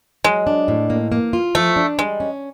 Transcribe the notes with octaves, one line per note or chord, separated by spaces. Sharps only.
F#3 G#3
D4
A2
A#3
A#3
F4
F3 A3
D4
G3 G#3
C#4